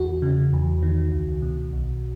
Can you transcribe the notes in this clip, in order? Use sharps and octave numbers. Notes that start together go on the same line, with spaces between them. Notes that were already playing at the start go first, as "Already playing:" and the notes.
Already playing: E2 F#4
C#3
E2
D#3
C#2
B2
B1